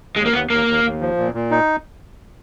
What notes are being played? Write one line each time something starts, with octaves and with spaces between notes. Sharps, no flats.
D#2 G#3
A#3
D#2 B3
D#2 A#3
D#2
D#2
F3
A#2
A#2
D#4